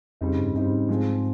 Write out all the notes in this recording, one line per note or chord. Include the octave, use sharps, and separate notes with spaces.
F2 C#3 G3 C4 D#4
G2
G2 C#3 G3 C4 D#4
G#2
F3 G#3 C4